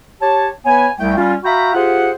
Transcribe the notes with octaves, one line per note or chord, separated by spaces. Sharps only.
G4 C#5 A5
B3 B4 C#5 G#5
C2 A3 G5
G3 C#4 F4
F#4 E5 F5 G5 A#5 B5
F4 G4 G#4 C5 F#5